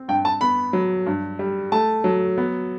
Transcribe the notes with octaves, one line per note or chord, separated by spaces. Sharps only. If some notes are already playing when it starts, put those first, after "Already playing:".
Already playing: C4
G2 G5
A5
B3 B5
F#3
G2
G3
A3 A5
F#3
B3